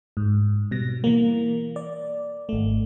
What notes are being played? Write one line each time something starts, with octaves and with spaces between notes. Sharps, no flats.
G#2
B2 G3 A#6
E3 A#3
D5
G#1 A3